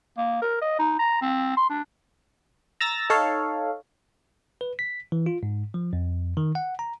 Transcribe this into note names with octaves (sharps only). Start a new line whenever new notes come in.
A#3
A#4
D#5
D#4
A#5
C4
C6
D4
A#5 E6 A6 A#6
D#4 A4 C#5 F5
B4
B6
E3
F4
G#2
F3
F2
D#3
F#5
A#5